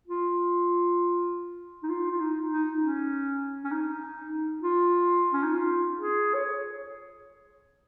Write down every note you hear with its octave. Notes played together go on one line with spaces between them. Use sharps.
F4
D#4
F4
F4
D#4
D#4
C#4
C#4
D#4
F4
C#4
D#4
F4
G#4
C#5